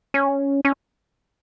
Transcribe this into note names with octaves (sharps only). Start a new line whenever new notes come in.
C#4
C#4